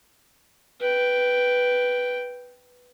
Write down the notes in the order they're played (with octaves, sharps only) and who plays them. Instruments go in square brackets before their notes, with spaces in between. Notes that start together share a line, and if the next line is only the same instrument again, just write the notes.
[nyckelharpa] B4 G5